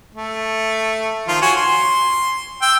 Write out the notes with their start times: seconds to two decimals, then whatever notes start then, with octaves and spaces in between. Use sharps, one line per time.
0.15 A3
1.28 D#3 F3 F4
1.42 F#4 C#5 G#5
1.56 C6
2.62 G5 E6